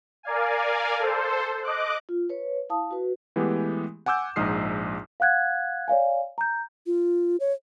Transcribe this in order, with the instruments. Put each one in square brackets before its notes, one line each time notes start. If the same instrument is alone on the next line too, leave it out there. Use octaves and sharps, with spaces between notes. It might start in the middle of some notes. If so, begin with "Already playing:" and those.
[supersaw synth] A#4 D5 F5 G#5
A4 C5
D#5 D6 F#6
[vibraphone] F4
B4 C#5
E4 F5 A5 D#6
F#4 B4
[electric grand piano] E3 G#3 A3 B3 G4
F#5 G#5 D6 E6 G6
A#1 G#2 D#4 D#6 F6 C7
[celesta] F5 F#5 F#6 G#6
C#5 D5 F5 G#5
A#5 G6
[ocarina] F4
C#5